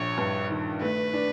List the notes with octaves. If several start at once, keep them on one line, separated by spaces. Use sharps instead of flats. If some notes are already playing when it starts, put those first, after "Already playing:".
Already playing: A#1 C#5
G2
D#3
A3 B4
D4